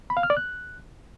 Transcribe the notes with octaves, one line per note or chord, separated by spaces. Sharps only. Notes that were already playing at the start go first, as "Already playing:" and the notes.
B5
F5
F6
D5
F#6